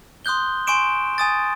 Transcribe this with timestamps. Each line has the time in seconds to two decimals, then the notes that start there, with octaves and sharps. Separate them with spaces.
0.25 C6 D#6 F#6 G6 G7
0.67 G#5 C6 C#6 D7 E7
1.18 G#5 D#6 A6